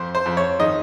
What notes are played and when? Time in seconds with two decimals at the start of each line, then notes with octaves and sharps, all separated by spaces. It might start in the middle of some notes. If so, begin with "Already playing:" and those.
Already playing: F2 C5
0.15 C5
0.26 F2
0.37 C#5
0.60 D#3 D#5